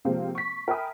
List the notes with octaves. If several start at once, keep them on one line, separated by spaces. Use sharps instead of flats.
C3 F3 G#3 A#3 C4
C#6 B6
A#4 E5 G5 G#5 B5 D#6